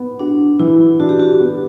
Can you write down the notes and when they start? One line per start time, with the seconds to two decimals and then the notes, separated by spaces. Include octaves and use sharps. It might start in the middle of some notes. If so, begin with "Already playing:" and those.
Already playing: B3
0.19 D4 F#4
0.59 E3 E4
1.00 D4 F#4
1.09 G4
1.20 F#4
1.40 B3